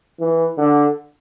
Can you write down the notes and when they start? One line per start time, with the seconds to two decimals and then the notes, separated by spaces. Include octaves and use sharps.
0.20 E3
0.57 D3